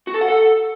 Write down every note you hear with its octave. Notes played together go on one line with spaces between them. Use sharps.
F#4
A4
F#5
A4